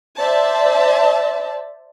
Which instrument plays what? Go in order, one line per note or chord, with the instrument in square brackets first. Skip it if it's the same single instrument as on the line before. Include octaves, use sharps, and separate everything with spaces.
[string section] C5 D5 E5 A5